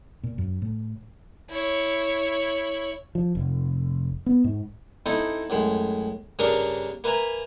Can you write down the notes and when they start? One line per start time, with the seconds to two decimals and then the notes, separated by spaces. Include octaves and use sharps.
0.24 A#2
0.38 F#2
0.62 A2
1.50 E4 C#5
3.15 F3
3.35 F1
4.26 B3
4.44 G#2
5.06 C4 D#4 E4 A4 D#5
5.50 F#2 A2 G#3
6.39 G2 C#3 A#3 D4 A#4 D#6
7.04 A#3 B4 E5 G#5 A#5